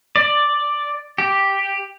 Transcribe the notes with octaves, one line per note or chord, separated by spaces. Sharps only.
D5
G4